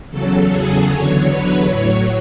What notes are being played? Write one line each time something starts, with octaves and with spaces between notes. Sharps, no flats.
E2 C#3 F#3 A4
G#4
E2 D3 F#3 C#5
B4
A2 F#3 C#5